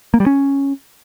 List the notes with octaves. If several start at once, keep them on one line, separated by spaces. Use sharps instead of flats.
A#3
G3
C#4